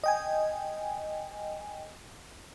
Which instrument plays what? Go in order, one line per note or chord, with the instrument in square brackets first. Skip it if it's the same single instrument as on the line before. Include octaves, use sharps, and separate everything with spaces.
[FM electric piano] D#5 G5 G#5